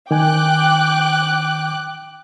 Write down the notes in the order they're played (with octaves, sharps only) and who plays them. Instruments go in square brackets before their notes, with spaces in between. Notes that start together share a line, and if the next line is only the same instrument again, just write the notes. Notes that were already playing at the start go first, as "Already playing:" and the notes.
[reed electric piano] D#3 G#5 [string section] G5 D6 F#6